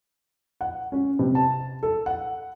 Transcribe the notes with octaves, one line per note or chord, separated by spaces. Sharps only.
F#5
C#4
C3
A5
A4
F#5